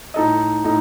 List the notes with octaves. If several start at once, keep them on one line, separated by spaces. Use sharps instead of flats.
A2 A3 D#4 A4 D#5
A2 A3 D#4